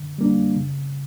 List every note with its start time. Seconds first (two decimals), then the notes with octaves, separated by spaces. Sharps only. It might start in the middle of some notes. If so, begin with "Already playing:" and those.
Already playing: D3
0.18 G3 A#3 D4
0.56 C#3